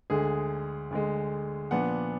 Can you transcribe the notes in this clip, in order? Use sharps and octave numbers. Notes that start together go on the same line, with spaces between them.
D2 D3 G#3 G#4
D2 D3 G#3
A#2 F3 B3 D4 F#5